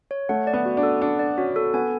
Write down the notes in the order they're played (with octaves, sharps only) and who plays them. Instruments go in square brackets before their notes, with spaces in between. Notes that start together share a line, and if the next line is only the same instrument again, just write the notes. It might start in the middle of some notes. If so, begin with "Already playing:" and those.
[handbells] C#5
[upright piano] A3 [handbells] F#5
[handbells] D5
[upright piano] B3
[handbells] F#4
[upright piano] D4
[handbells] A4
[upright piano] D4 [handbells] F#5
[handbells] D5
[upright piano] C#4 [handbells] F#4
[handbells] A4
[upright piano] B3 [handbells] G#5